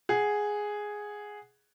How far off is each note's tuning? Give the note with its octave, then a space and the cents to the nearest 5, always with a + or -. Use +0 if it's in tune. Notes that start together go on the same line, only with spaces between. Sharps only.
G#4 +0 F#5 +0